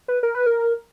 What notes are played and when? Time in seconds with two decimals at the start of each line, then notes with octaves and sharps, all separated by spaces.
0.08 B4
0.23 A#4
0.35 B4
0.46 A#4